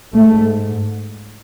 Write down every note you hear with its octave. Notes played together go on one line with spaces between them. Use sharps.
G#2 A3